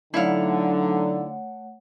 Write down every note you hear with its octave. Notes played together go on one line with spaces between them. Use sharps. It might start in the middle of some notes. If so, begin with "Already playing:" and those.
D3 F#3 A3 D#4 E4 C#5 F5 F#5